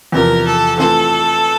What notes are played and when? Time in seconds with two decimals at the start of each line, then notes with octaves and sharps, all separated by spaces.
0.12 E2 C3 F3 A#4
0.45 A4
0.77 E3 A3 C4 F4 A4